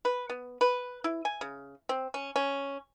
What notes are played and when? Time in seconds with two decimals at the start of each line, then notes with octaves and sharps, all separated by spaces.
0.05 B4
0.30 B3
0.61 B4
1.04 E4
1.25 G#5
1.41 C#3
1.89 C4
2.14 C#4
2.36 C#4